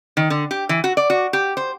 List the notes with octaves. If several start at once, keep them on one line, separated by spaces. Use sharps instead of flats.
D#3
D3
G4
E3
F#4
D5
F#4
G4
C5